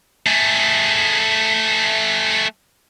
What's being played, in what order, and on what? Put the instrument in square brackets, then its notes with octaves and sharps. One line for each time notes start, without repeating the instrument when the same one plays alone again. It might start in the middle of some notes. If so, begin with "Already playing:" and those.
[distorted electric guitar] A3 G#4